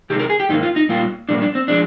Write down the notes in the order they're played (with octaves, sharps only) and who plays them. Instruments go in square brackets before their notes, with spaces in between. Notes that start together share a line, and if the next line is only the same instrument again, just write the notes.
[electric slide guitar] C3 D#3 G#3 G4
A#4
G#4
G4
G#2 D#3 A#3 D#4
F4
D#4
A#2 G3 A#3 F4
A#2 G3 A#3 D4
D4
C4
F3 G#3 D4